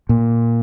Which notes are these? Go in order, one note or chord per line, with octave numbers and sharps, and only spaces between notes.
A#2